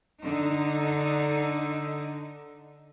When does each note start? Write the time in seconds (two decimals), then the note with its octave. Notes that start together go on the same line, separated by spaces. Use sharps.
0.24 D3 D#4